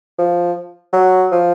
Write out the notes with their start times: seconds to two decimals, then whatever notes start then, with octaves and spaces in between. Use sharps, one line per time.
0.19 F3
0.93 F#3
1.32 F3